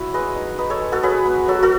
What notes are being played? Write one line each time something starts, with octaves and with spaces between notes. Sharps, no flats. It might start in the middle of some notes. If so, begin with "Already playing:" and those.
Already playing: E4 F#4 C#5
G#3 B4 D#5
D#4
D#4 B4 D#5
A4 C#5
G#3
F#4 A4
F#3 G#4 B4
B3
F#3 F#4 A4
F#4 A4